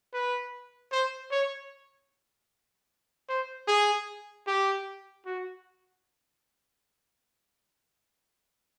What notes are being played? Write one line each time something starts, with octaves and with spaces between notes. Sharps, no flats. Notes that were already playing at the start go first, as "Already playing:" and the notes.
B4
C5
C#5
C5
G#4
G4
F#4